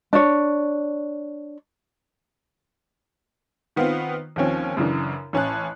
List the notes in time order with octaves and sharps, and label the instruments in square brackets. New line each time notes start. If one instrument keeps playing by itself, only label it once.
[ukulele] D4 C#5
[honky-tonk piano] D#3 B3 C4 F4
D#2 F3 C4 C#4
F#2 C#3 E3 D4
A1 C#4 A5 F#6